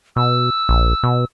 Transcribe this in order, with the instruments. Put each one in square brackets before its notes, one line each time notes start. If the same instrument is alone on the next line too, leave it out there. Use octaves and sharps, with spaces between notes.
[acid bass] B2 [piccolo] E6
[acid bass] A#1
B2